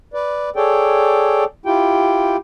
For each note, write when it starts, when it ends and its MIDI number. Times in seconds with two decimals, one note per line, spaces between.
0.14 0.50 71
0.14 0.50 74
0.56 1.44 68
0.56 1.44 69
0.56 1.44 73
0.56 1.44 74
0.56 1.44 79
1.66 2.37 64
1.66 2.37 65
1.66 2.37 67
1.66 2.37 79